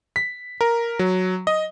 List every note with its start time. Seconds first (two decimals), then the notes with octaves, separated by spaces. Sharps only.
0.16 B6
0.61 A#4
0.99 F#3
1.47 D#5